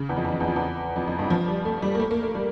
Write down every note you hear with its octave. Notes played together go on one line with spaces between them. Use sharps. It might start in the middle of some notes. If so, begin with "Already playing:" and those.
Already playing: C#3
E2
F2
E2
F2
E2
F2
E2
F2
F2
G2
F3
G3
A3
G3
A#3
A3
A#3
A3
G3